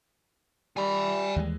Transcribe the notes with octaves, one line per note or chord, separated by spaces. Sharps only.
G3 G#5 B5
D#2 E3 G#3